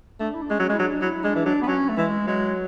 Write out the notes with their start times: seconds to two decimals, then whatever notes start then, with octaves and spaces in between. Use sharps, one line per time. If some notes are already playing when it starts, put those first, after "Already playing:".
0.20 A3 D4
0.34 E4
0.42 D4
0.50 G#3 C#4
0.59 F#3
0.70 G#3
0.74 E4
0.79 F#3 D4
1.01 F#3 E4
1.24 G#3 D4
1.35 E3
1.46 F#3 D4
1.62 B3
1.68 F#3 C#4
1.89 A3
1.97 E3 G#3
2.27 F#3 G#3